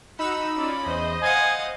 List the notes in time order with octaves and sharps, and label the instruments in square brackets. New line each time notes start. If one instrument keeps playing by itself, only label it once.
[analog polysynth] D#4 E6 [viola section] F#4 F#5 [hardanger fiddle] B5
[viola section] C#4 F4 D5
[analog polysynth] E2 [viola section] C5 D#5
[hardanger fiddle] F5 F#5 [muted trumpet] G#5 [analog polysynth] D#7